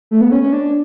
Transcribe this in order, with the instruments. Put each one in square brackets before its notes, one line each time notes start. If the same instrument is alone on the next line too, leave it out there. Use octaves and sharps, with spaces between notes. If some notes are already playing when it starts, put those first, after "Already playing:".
[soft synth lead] A3
B3
C#4
C#4
D4